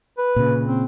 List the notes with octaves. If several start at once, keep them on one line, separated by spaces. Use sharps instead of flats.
B4
A#2 C#3
C4